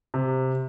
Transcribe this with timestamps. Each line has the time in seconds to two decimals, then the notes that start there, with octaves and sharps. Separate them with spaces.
0.14 C3